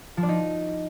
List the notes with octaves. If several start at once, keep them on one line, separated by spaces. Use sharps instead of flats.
F3
D4
D#4